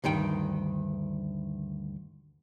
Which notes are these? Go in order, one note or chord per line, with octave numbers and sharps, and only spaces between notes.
D2 G2 D#3 G5